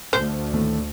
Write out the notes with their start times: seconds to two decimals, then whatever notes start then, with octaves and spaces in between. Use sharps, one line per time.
0.13 D2 C5
0.54 A2 D#3 A3